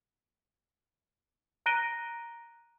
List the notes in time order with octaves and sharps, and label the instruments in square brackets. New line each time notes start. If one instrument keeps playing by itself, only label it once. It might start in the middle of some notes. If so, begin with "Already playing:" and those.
[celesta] A#5 F#6 A#6 D7 D#7 G7